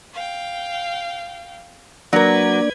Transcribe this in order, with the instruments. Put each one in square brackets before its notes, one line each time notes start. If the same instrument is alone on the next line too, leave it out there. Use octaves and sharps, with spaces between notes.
[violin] F5 G5
[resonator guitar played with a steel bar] F#3 A#4 [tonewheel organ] A#3 D4 D5 [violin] B4 G#6